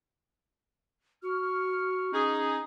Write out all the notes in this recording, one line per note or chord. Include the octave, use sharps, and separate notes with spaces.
F#4 C#6 F6
C#4 D#4 G#4